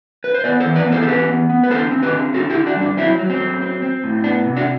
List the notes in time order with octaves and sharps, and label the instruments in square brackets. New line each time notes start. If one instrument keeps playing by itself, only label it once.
[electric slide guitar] B4
C5
B3 B4 D5
A4 C5
E3
B4 D5
B3
A4 C5
A4
E3 G4 B4
B3
B3
B4
D3 A4 C5
C4
G4 B4
D3
D3 F#4 A4
E4 G4
D3
D4 F#4
G3 D4
F#3 C4 E4
F#3
C4
F#3
C4
C4
A2
B3 D4
C3
D4 F#4